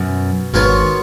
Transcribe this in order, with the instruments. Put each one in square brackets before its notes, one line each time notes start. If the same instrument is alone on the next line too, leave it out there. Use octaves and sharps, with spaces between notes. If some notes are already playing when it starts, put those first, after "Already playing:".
Already playing: [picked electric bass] F#2 [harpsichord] B2
[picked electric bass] G#1 G#2 [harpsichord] F#3 B3 F4 A#4 C#5